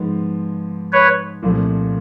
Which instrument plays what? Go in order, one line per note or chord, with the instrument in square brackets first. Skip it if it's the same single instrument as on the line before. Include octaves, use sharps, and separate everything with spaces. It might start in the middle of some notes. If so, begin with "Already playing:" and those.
Already playing: [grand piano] G#2 F3 G#3 B3
[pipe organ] B4 C#5
[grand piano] C2 A#2 F3 A3 C4